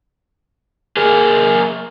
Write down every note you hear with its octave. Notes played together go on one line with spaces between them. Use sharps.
A#3 G#4